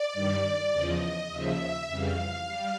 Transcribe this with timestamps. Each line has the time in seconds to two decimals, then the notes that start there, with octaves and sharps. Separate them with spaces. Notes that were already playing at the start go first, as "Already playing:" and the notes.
Already playing: D5
0.13 G2 D#3 G3
0.72 E2 C#3 F3 D#5
1.30 D#2 C#3 F3 E5
1.88 F2 C#3 E3 G3 F5
2.46 G3